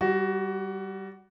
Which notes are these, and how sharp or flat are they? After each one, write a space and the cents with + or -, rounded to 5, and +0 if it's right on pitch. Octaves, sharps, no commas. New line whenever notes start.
G3 -15 F#4 +15